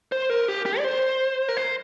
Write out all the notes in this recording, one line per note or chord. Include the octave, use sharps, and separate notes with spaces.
C5
A#4
G4
G4
D5
C5
A#4
C5